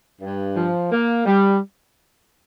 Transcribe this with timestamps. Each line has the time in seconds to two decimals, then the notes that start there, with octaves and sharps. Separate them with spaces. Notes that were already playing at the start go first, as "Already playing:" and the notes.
0.21 G2
0.56 F3
0.91 A#3
1.26 G3